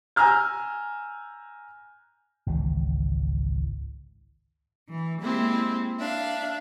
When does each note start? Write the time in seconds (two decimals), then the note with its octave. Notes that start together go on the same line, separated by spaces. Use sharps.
0.16 G#5 A#5 E6 F6 G6
2.46 G#1 C#2 E3
4.90 E3
5.22 G#3 A#3 C4 E4 G4
5.99 D4 E5 F5